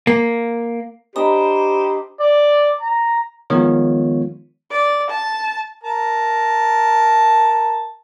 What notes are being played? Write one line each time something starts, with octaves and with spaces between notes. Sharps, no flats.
A#3
D4 G4 C5 D#5 A#5 B5
D5
A#5
D#3 F3 G#3 B3 F4 C#5
D5
A5
A#4 A5 A#5